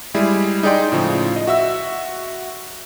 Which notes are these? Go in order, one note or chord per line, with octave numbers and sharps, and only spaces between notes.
G3 G#3 E4 G#4
D#4 G#4 D5 G5 C6
A2 C#3 F3
D#5
F#4 E5 E6